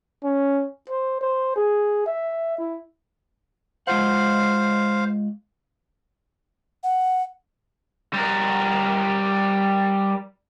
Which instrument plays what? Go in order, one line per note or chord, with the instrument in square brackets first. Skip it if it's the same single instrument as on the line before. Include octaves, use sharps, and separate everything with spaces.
[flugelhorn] C#4
C5
C5
G#4
E5
E4
[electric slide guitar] G#3 F4 F#5 [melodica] C5 F5
[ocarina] F#5
[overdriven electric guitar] G3 A#4